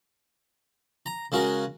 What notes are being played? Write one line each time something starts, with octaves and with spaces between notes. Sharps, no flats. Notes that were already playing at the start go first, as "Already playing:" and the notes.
A#5
C#3 G#3 F#4 A#4